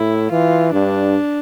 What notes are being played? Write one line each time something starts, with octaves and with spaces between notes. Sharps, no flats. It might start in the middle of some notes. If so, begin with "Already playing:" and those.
Already playing: A2 E4
E3 F4
G2 D4